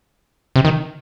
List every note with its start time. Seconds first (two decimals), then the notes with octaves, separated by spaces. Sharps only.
0.56 C3
0.65 D#3